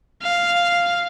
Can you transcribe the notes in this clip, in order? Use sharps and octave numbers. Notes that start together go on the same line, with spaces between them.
F5